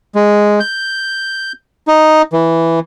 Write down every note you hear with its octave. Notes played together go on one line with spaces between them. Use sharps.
G#3
G6
D#4
E3